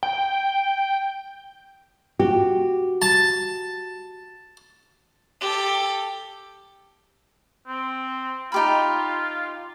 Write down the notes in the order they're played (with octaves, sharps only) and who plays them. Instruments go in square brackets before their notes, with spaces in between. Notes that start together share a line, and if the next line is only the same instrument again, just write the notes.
[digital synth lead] G5
[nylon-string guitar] F#4 G4
[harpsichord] A5
[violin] G4 A4
[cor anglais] C4
[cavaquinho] D#4 G4 B5 [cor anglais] F4